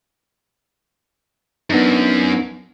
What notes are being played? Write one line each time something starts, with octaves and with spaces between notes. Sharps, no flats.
F#2 B3 D4 D#4